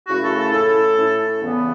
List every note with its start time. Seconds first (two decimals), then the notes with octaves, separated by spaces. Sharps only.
0.08 F#2 C#3 A3 C#4 E4 F#4
0.23 A4
0.38 A4
0.52 A2 A3 C#4 E4 A4
0.97 A2 A3 C#4 E4
1.41 E2 C#3 E3 B3